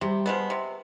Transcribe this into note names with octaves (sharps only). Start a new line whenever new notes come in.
C3 G3
F3 G#3 B3
C3